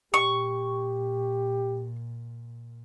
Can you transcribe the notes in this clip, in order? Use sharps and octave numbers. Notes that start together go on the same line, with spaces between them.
A#2 G4 C#6